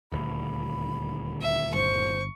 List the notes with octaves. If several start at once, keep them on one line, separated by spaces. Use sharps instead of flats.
D#1 D2 B5
E5
G1 C5 C#6